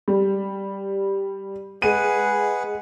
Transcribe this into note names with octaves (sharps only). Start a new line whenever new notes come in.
G3
G#3 G#4 B4 F#5 D#7